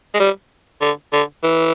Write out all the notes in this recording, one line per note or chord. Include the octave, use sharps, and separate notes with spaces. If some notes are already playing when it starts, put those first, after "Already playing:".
G#3
G3
D3
D3
E3